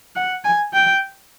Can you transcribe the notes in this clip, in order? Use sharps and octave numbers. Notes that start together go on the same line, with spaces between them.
F#5
G#5
G5